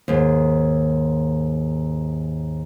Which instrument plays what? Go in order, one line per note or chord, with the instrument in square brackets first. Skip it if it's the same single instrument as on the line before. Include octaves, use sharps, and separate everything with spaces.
[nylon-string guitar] D#2 G#2